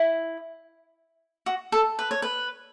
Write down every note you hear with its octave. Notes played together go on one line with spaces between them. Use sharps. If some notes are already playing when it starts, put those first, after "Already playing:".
Already playing: E4
F#4
A4
B4
C#5
B4